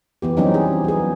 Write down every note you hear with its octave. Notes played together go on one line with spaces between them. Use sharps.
E3 B3 G4
F#3 G3 C4 C#4 D#4 G4
G#4
B3 G#4